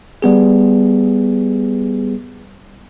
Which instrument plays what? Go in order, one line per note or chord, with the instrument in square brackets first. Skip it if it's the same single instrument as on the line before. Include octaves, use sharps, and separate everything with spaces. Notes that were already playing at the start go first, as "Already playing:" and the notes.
[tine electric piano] G3 B3 G#4